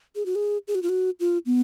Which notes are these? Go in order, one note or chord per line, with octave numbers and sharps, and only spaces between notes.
G#4
F#4
G#4
G#4
F#4
F4
F#4
F4
B3